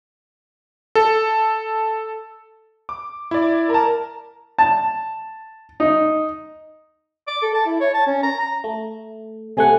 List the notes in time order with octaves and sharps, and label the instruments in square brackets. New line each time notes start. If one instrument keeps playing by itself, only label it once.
[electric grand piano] A4
D6
E4 D5
[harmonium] A#4 [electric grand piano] A5 A#5
[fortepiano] A5
D#4
[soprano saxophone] D6
A4
A5
E4
C#5
A5
C#4
A#5
A#5
[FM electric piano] A3
[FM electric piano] C3 A3 F#5 [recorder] G#5